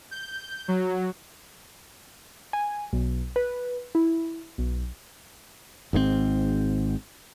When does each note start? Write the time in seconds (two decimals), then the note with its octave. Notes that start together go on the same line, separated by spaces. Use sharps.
0.11 G6
0.68 F#3
2.53 G#5
2.93 B1
3.36 B4
3.95 E4
4.58 B1
5.93 G#1 G#2 C#3 C4